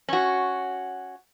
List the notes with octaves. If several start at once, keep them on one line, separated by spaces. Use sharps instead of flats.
C#4 F#4